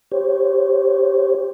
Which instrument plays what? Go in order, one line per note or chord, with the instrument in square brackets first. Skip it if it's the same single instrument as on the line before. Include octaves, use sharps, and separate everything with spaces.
[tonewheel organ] G4 C5 C#5